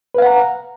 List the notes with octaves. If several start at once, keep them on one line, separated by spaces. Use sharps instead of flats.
B4 F5 F#5 A#5